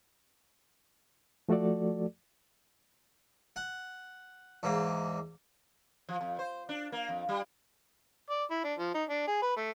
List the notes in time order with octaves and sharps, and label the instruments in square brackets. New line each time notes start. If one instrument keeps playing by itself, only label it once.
[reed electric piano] F3 A3 F#4 A4 D5
[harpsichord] F#5
E2 G#2 A#3
[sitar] F3
F2
C5
D4
A#3
F2
G3
[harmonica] D5
E4
D4
F3
D#4
D4
G#4
B4
A3